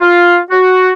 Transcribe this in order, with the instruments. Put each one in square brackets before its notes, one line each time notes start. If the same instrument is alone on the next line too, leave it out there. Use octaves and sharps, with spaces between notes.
[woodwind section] F4
F#4